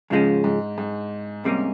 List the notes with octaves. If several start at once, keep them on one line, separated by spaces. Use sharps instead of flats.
G#2 C#3 F3 G#3 C#4
G#2
G#2
C2 G#2 C3 G3 A#3 C#4